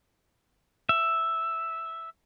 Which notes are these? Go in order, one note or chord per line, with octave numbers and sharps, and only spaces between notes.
E5